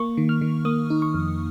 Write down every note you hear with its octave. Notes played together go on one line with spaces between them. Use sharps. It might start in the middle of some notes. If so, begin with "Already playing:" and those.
Already playing: A#3 C#6
D#3
F6
D#3
A#3 D#6
D#4
C#6
F2